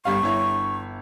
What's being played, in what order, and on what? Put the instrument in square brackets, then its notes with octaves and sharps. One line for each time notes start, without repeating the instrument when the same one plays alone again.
[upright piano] G1 G3 F5 [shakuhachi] C#6
[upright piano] G1 E4 C#5